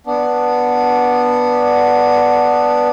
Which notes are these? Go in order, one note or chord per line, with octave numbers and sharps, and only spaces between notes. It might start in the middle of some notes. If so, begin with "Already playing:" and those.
B3 D4